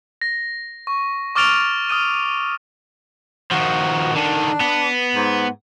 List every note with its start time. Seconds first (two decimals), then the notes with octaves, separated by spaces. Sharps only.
0.22 A#6
0.87 C#6
1.35 C#6 D6 F6 A6 D7 F7
1.90 D#6 F6 D#7
3.52 D#3 F3 F#4
4.16 D3 D#3 D4
4.60 B3
5.15 G#2